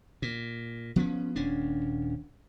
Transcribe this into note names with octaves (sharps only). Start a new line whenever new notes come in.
A#2
F3 B3 C#4
D#1 C#4 D4